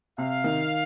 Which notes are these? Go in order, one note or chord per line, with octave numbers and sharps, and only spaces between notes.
C3 F5
D#3